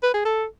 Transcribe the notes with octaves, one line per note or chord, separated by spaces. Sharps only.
B4
G#4
A4